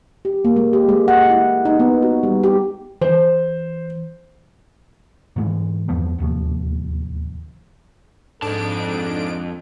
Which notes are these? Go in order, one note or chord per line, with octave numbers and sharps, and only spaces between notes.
G4
A#3
G#3
G4
G#3
F#5
E4
D#4
B3
F#4
G3
G4
E3 C5
G#2 E3 G#3
E2 G2 F3 B3
D1 D#2 C3 F3
F2 G#2 D4 A4 A5 D7